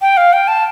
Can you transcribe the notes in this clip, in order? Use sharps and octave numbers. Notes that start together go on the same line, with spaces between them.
G5
F5
G5
A5